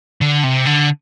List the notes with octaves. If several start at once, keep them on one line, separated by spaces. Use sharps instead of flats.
D3
C3
D3